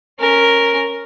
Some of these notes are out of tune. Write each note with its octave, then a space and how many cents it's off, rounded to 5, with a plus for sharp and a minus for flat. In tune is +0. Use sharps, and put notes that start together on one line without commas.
C#4 +0 A#4 +0